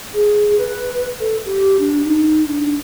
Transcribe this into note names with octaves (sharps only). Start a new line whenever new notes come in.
G#4
B4
A4
G4
D4
D#4
D4